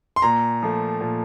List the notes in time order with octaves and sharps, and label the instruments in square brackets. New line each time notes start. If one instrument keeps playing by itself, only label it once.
[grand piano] C6
A#2 A#5
F3 A3
A#2